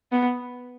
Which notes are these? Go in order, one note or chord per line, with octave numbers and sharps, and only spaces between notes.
B3